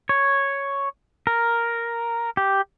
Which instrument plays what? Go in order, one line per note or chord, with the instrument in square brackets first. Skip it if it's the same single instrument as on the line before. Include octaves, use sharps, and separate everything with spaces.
[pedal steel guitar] C#5
A#4
G4